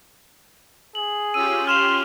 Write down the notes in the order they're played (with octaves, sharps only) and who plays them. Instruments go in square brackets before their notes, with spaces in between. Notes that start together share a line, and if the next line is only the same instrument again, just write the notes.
[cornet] G#4 [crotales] F#7
[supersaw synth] C#4 F4 G4 [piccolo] E6 [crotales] D#7
[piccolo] C6 [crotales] F6 E7 F7